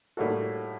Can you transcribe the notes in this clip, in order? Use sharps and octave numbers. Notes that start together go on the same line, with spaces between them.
A2 G3 A#3 F#4 A4